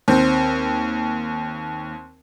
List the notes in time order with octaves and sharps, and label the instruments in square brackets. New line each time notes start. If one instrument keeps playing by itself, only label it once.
[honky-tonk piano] D#2 [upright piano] C4